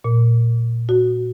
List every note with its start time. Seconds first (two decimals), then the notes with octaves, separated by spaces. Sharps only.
0.04 A#2
0.89 F#4